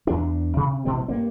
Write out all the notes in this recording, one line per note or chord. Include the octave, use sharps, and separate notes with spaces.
E2 D4
C3
A1 B2 G3 C4
G2 A#3 C4